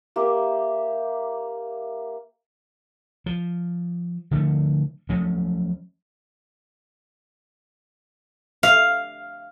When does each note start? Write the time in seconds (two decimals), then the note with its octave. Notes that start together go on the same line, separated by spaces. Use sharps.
0.16 A#3 G4 E5
3.26 F3
4.31 D3 F3 A3
5.09 F3 F#3 A3 C#4
8.63 F5